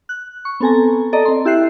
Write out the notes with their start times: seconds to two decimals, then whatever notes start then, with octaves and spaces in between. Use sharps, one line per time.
0.09 F#6
0.45 C#6
0.60 B3 C4 A4 G#5 A#5
1.13 A4 D5 D#5 A#5
1.25 C4 C6
1.45 E4 G4 E5 F#6 C7